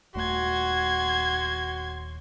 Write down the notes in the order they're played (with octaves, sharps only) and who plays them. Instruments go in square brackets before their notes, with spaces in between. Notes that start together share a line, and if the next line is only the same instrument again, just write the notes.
[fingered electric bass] D#1 A3 [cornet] F#4 [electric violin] C6 G#6